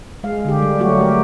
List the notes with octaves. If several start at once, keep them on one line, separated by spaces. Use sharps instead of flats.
G#3 F5
D3 G4
G3
F#3 G3 A3 F#4 G4
A3 G4 A#4